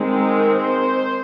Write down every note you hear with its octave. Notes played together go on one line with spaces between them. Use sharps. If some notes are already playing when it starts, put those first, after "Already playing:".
Already playing: D#3 G#3 C4
A#4
C5